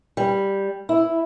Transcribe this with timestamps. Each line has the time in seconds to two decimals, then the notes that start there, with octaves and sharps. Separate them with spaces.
0.17 G3
0.89 E4